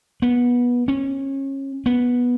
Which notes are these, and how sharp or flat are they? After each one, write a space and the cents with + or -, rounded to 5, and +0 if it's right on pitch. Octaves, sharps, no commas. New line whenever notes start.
B3 -20
C#4 -25
B3 -10